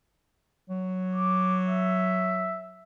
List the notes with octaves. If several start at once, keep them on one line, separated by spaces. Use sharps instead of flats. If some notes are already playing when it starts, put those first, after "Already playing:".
F#3
D6
E5